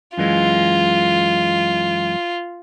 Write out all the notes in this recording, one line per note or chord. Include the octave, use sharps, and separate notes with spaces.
F#2 E3 G#3 F4